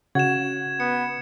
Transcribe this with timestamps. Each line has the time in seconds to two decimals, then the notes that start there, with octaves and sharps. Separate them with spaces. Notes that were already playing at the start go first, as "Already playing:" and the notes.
0.15 C#3 F#4 G#6 E7
0.80 B3 C#7